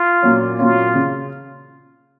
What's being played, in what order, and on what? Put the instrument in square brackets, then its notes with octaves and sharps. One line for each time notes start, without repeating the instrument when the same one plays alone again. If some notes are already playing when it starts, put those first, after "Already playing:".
Already playing: [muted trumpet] F4
[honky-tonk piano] A#2 F#3 C#4
[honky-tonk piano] A#2 F#3 C#4 [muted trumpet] F4
[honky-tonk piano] C#3